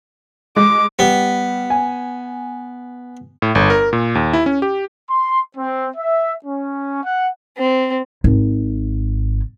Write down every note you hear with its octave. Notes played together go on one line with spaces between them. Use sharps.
G#3 D6
G3 B3
G#5
A2
G1
A#4
A#2
D#2
E4
C#4
G4
C6
C4
E5
C#4
F#5
C4
G#1